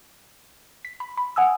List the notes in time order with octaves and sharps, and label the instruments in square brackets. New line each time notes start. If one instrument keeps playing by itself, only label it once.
[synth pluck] B6
B5
B5
F#5 G#5 D#6 E6